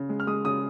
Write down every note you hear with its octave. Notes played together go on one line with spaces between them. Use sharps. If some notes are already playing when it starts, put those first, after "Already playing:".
Already playing: C#3
G#3
F6
G#3 D#6
C#3 D#6